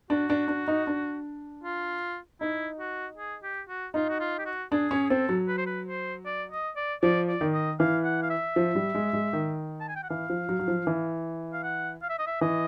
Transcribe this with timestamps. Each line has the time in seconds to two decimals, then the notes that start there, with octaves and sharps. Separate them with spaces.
0.10 D4 F#4
0.30 D4
0.48 D4
0.68 D#4
0.87 D4
1.64 F4
2.41 D#4 E4
2.80 F#4
3.17 G#4
3.43 G4
3.69 F#4
3.94 D#4 F4
4.09 F#4
4.20 F4
4.39 G4
4.46 F#4
4.72 D4 G#4
4.91 C#4
5.04 G#4
5.09 C4 A4
5.29 F#3
5.48 B4
5.58 C5
5.67 B4
5.87 C5
6.26 D5
6.52 D#5
6.76 D5
7.03 F3 D5
7.28 D5
7.41 D#3
7.53 D#5
7.80 E3 F5
8.04 F#5
8.23 F5
8.30 E5
8.56 F3
8.75 G3
8.95 G#3
9.13 G#3
9.33 D#3
9.80 A5
9.89 G#5
9.96 G5
10.03 F#5
10.09 E3 F5
10.30 F3
10.49 F#3
10.59 F#3
10.68 F3
10.87 E3
11.53 F5
11.63 F#5
12.02 F5
12.10 E5
12.19 D#5
12.27 E5
12.41 E3 D#5